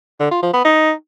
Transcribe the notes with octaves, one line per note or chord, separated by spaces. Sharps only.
D3
F4
F3
B3
D#4